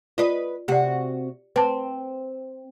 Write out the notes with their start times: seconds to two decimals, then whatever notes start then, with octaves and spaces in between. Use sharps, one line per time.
0.18 F4 B4 D5 D#5
0.68 C3 F#4 G4 D5
1.56 C4 B4 A5